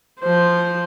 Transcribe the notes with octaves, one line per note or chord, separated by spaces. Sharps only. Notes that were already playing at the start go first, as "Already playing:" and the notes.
F3 C5